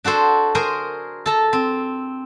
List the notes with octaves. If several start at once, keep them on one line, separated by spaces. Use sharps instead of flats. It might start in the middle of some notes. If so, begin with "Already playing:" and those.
D4 F#4 A4 C5
G#4 A#4 C5 G#5 A#5
A4 A5 A#5
C4